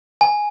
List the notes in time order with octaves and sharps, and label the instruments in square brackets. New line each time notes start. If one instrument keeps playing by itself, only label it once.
[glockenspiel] G#5